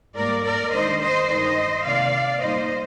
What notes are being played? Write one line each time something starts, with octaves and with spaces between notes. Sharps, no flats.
G#2 G3 A#3 A#4 D5
A#4 D5
D#3 G#3 D4 C5 D#5
C5 D#5
G2 D#3 G#3 D#4 C5 D#5
C3 D#3 A#3 D5 F5
A#2 G3 A#3 D#4 C5 D#5